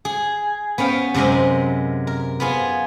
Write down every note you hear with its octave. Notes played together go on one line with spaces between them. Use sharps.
G#4
B3 C#4 F5 G5
F#2 C3 G#3 A#4 D#5
A#4
B3 F4 G#4